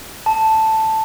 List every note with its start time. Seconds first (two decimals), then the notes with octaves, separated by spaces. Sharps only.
0.26 A5